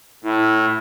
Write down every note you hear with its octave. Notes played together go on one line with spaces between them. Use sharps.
A2 E4